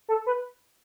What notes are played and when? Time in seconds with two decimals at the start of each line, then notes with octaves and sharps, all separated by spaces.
0.09 A4
0.26 B4